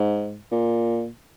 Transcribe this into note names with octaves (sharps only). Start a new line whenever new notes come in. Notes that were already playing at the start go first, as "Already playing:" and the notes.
Already playing: G#2
A#2